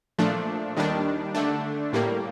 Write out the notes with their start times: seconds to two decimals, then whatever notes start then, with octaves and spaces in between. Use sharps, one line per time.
0.18 A#2 F3 A3 D4
0.76 D#2 D#3 G3 D4
1.35 D3 A3 D4
1.93 A2 G3 A#3